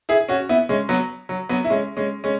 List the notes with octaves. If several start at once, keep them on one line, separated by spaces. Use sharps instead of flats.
E4 G#4
C#4 F#4
B3 E4
G#3 C#4
F#3 B3
F#3
F#3 B3
E4
G#3 C#4
G#3 C#4
G#3 C#4